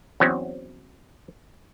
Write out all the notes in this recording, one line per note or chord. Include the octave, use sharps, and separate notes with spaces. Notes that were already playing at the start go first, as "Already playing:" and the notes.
E2 F#3 C4 C#4